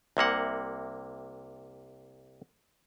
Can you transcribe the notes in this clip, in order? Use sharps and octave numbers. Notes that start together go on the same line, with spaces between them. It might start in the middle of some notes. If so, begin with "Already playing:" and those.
C2 C3 A#3 F#5